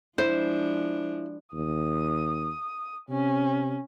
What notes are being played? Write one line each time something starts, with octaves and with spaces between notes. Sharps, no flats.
F3 G#3 D4 E4 C5
D#2 D#6
C3 C#4